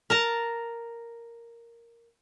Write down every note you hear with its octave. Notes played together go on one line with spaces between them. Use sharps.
A#4 A5 A#5